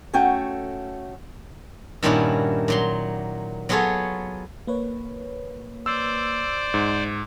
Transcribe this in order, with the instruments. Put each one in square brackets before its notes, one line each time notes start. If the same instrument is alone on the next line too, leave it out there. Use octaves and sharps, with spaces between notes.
[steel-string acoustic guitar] A3 C#4 F#4 A4 G5
[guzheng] G2 A#2 D#3 C#4 E4 F#4
A#2 F#3 C6
F#3 B3 F4 G#4 A4 C#5
[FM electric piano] A#3 B4 C#5
[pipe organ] C5 D5 [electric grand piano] E6
[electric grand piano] G#2